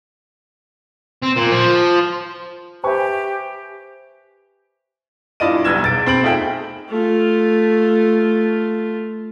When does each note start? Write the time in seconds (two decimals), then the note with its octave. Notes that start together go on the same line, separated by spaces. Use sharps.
1.23 C4
1.36 A#2
1.52 F3
2.83 G4 B4 C5 E5 G#5 C#6
5.40 G2 E4 F4 D5 D#5 D#7
5.64 B1 G3 B3 E6 G#6 E7
5.82 E1 A6 D7
6.06 C4 B5 D7 F#7
6.22 A3 D#4 F4 G#4 E5 G5
6.89 A3 F4